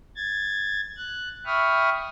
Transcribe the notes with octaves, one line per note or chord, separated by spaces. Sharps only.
G#6 A6
F#6
E5 G5 B5 C#6 D#6 F6